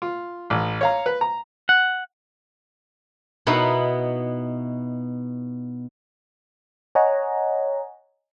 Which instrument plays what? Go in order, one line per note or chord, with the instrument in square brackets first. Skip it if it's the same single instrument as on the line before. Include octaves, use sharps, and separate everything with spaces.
[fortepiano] F4
A1
C#5 F5 A#5
B4
A#5
[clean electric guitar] F#5
[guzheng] B2 B3 D#4 E4
[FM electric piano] C#5 D#5 F#5 G#5 A#5